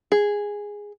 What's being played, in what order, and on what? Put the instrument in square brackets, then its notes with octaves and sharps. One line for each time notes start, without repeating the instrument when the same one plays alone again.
[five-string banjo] G#4